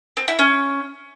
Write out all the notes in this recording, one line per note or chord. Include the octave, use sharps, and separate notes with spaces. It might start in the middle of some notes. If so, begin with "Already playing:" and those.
C4
E4
C#4